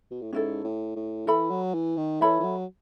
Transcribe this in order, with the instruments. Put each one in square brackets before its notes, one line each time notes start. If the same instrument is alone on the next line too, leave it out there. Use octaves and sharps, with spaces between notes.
[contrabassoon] B2
A2
[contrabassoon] G#2 [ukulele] C#4 E4 A4
[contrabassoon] A2
A2
[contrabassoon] E3 [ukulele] A4 E5 B5
[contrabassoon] F#3
E3
D#3
[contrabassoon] E3 [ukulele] A4 C#5 E5 B5
[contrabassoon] E3
F#3